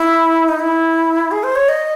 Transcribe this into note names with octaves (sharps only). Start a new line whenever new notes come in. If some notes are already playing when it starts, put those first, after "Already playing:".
Already playing: E4
D#4
E4
G#4
C5
C#5
D#5